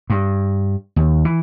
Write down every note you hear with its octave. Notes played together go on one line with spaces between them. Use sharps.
G2
D#2
E3